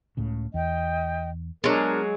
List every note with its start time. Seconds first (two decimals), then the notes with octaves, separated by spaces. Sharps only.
0.17 C#2 A2 C#3
0.54 E2 D#5 G5
1.64 F#3 G#3 B3 D4 A#4